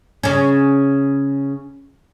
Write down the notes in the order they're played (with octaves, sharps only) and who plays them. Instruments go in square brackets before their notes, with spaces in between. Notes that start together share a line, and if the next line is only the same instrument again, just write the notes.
[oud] C#3 C#4